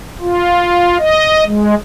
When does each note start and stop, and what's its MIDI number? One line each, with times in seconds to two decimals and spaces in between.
0.21 0.97 65
0.99 1.44 75
1.46 1.74 56